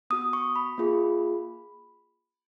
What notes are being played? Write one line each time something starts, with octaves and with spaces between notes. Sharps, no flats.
B3 F#4 D#6
C#6
B5
A#3 F4 G#4